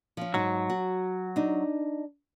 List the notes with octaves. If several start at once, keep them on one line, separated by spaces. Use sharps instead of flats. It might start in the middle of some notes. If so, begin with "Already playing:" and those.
F3 C#4
G#2 F#3 D#4
F#4
D4 D#4